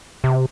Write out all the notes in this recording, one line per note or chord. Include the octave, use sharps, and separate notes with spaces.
C3